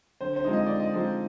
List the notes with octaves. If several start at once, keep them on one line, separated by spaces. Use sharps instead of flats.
D3 C5
C5
F3 G#3 C4 D#4
D#5
D3 D5
D#5
F3 G#3 C4 D#4